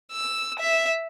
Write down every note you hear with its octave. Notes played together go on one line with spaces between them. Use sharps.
E6
E5